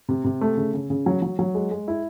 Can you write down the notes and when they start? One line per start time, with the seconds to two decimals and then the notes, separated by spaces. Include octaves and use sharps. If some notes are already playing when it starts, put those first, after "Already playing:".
0.09 C3
0.24 C3
0.41 A3
0.57 C#3
0.74 C#3
0.90 C#3
1.06 F#3
1.22 F#3
1.39 F#3
1.55 G#3
1.71 G#3
1.88 E4